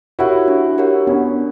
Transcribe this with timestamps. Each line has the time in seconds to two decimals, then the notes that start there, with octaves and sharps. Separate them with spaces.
0.19 E4 F#4 G4 A#4 C#5 F#5
0.48 D4
0.78 G4 A#4 C#5 F#5
1.07 B3 C#4 D4